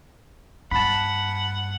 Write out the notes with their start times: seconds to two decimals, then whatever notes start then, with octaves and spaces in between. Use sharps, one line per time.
0.71 G2 F#5 A5 B5